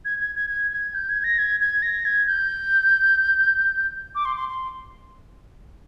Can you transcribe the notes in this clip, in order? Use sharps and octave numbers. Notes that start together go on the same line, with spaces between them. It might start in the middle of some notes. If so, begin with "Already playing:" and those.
G#6
G#6
G#6
G#6
G#6
G6
G#6
A#6
G#6
G#6
A#6
G#6
G6
D6
C6
C6
C6